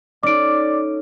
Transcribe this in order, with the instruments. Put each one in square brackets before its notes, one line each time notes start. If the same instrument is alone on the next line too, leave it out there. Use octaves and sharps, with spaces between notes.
[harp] C#4 D#4 A4 [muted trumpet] D5 [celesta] D6 D7